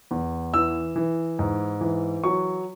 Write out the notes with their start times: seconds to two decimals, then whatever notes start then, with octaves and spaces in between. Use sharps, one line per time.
0.11 E2
0.54 E3 E6
0.96 E3
1.39 G#2
1.81 E3
2.24 F#3 C#6